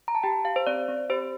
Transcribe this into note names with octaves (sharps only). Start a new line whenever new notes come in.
A#5
A5
G4 G5
G4 F5
C5
C4 D5
C4
G4 C5